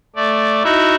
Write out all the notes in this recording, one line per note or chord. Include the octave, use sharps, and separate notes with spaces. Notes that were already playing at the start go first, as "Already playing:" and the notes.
A3 D5
D#4 E4 F#4 E5